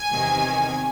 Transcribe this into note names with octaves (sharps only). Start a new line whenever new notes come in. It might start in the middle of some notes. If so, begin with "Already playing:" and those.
Already playing: G#5
E2 C3 D#3